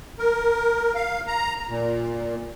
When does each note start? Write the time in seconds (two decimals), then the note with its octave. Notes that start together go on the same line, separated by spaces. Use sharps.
0.18 A#4
0.95 F5
1.27 A#5
1.69 A#2